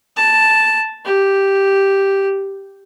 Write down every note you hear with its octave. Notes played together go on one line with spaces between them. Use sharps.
A5
G4